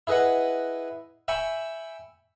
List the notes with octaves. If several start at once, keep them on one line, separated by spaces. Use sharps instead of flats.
E4 G#4 B4 D#5 F#5
E5 G5 G#5 B5 C#6